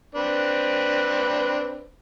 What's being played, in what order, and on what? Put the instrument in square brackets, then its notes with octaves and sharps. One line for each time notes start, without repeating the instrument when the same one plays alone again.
[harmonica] C4 D4 B4